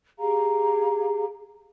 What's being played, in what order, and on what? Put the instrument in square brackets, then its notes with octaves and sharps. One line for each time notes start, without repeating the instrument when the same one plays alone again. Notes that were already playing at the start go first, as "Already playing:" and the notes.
[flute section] G4 G#4 F5 A#5